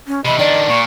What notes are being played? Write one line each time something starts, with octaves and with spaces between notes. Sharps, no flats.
C#4
C3 E3 D#5 B5
D#3 D4 D5
A#2 C#6